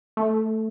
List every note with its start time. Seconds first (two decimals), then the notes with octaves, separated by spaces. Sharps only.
0.17 A3